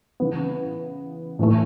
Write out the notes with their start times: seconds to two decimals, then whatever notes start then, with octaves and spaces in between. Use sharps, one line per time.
0.20 C#3 E3 B3
1.39 A2 E3 A3